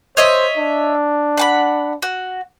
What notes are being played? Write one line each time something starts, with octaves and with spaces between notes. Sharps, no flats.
C5 C#5 D#5 E5
D4
F#5 A5 B5
F#4